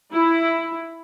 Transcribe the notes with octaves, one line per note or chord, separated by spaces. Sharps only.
E4